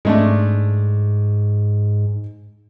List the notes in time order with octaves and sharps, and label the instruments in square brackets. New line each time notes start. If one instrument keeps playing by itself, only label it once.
[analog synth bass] G#2 [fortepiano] G#3 A3 D4